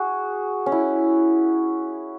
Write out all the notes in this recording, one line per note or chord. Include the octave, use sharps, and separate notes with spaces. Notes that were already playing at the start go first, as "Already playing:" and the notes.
Already playing: F#4 G#4
C#4
E4